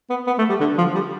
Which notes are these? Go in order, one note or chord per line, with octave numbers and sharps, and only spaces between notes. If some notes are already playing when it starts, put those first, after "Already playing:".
B3
B3
A3
G3
D3
F3
G3